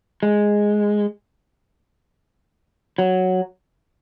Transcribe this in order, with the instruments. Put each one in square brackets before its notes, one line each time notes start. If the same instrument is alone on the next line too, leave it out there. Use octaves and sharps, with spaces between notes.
[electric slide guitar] G#3
F#3